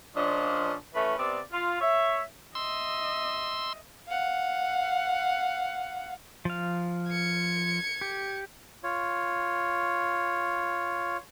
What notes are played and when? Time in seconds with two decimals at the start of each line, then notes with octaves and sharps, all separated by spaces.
0.15 A#2 F3 C#4 D4 D#5
0.94 E3 A3 C#4 B4
1.18 C3 B3 C4 D5
1.52 F4
1.80 C#5 E5
2.55 D#5 E5 C6 E6
4.08 F5 F#5
6.45 F3 F5
7.09 G#6 C#7
8.01 G4
8.84 F4 C#5